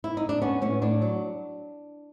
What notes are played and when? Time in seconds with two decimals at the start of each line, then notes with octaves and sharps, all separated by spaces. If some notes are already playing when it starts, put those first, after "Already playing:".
0.04 E4
0.17 D#4
0.29 D4
0.42 B3 C#4
0.62 A2 C#4
0.82 A2 D4
1.02 F#3